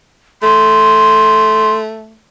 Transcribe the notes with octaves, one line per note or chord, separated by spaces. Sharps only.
A3 C6